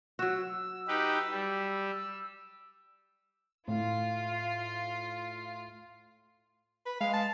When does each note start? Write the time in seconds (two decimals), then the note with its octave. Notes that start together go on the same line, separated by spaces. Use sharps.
0.19 F#3 F#4 E6
0.88 D#4 G4 B4
1.31 G3
3.68 A2 F4
6.86 B4
7.01 G#3 F5
7.14 A5